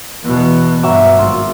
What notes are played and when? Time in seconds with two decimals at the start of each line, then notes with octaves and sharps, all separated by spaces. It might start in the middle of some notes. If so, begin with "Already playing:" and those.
0.24 E2 B2
0.83 G2 F#3 E5 D6
1.19 G#1 F4